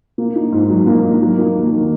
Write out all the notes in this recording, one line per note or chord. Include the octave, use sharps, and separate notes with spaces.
A#3
D#4
G#2
F#3
A#3
D#4
F#3
A#3
D#2
D#3